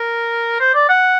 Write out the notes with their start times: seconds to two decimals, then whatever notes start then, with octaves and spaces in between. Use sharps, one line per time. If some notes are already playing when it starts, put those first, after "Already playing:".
Already playing: A#4
0.60 C5
0.74 D5
0.89 F#5